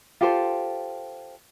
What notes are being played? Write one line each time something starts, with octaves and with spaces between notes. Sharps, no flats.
F4 G4 A4 C5